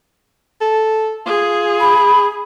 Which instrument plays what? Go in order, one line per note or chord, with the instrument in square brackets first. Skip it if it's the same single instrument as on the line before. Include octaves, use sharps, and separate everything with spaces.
[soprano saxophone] A4
[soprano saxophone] F4 [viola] G#4
[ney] B5